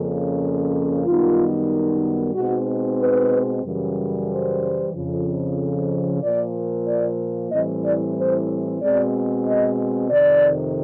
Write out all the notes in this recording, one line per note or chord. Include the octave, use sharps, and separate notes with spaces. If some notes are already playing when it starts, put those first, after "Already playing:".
Already playing: F2 C#3 F3 A#3 C#4
F#2 D#3 G3 B3 D#4 F4
B2 G#3 C4 D#4 F#4
B4
F#2 C#3 E3 G3
C5
F2 C#3 F3
A#2 F3 A#3 D5
D5
A2 E3 G3 C4 D#5
D5
C5
B2 G#3 C4 D5
D#5
F2 C3 D#3 D5